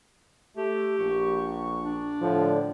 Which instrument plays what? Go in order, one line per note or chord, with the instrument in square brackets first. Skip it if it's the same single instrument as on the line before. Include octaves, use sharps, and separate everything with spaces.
[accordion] A3 [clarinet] G4
[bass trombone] A#1 [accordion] C#6
[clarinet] D4
[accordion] A2 D3 [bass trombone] F3